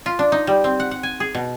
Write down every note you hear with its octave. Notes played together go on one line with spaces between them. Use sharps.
F4
D4
D#4
G3
C4
F#5
F#5
G#5
G#4
B2